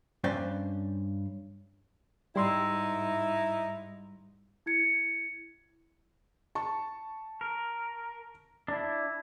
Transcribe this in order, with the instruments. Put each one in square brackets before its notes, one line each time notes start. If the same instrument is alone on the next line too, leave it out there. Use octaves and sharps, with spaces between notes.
[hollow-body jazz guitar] G2 C#4 C5 D5 G5
[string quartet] G#2 [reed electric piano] G3 C6 E6 [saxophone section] D#4 E4
[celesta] E4 G#6 C#7
[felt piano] A5 C#6
[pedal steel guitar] A#4
[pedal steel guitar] D4 E4 [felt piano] A5